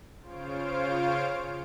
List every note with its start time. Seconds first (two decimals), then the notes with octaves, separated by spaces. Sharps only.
0.21 C#3 F4 C5 C#5 F5 D7